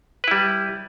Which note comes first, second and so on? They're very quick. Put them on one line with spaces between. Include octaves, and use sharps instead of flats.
B4 E4 G3